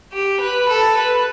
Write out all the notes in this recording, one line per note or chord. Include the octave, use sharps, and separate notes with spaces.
G4
B4
A4
B4